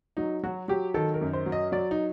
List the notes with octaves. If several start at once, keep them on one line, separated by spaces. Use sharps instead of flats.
F#3 D#4
F#3 F#4
F#3 G4
D#3 A4
A#4
F#2
C5
F#3
D#5
F#3 D5
D#4